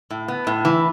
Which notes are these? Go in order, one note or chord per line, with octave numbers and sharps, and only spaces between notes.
A2
B3
A2
E3